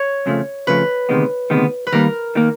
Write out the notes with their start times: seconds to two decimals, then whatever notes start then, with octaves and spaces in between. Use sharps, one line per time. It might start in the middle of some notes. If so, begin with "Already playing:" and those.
Already playing: C#5
0.26 F2 C#3 F3 A3
0.67 F2 C#3 F3 A3 B4
1.09 D2 C3 D#3 G#3 B3
1.50 D2 C3 D#3 G#3 B3
1.87 B4
1.92 D#2 D#3 G3 A#3 A#4
2.35 D#3 G3 A#3